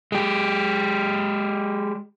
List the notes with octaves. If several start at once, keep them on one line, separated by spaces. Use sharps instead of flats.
G#3 G4